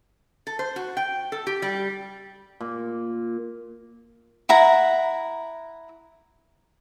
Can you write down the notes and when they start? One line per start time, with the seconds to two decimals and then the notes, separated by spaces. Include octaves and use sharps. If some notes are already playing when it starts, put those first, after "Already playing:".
0.47 A4
0.59 C5
0.76 F#4
0.97 G5
1.32 A4
1.47 G4
1.62 G3
2.61 A#2
4.49 E4 F#5 A#5